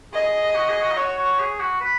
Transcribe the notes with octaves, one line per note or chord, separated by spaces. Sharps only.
G#4 D#5
F#4
G#4
F#4
D#4
F#4 C#5
F#4
G#4
F#4
B4